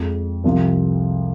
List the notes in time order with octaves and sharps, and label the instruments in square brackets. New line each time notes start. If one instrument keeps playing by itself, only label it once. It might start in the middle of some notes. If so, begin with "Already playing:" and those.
Already playing: [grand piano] F2 F3 G#3
C2 C3 F3